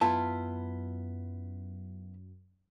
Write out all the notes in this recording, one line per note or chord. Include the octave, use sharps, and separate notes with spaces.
F#2 B3 E4 F4 A5